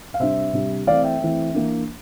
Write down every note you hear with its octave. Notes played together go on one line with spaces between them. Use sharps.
F5
C3 G3 D4 C5 E5
C3 G3 D4
E3 A3 C4 D5 F5
E5 G5
E3 A3 C4
E3 A#3 D4